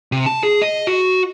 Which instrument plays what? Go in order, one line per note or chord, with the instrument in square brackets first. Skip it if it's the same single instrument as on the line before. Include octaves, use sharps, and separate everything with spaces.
[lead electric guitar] C3
A5
G#4
D#5
F#4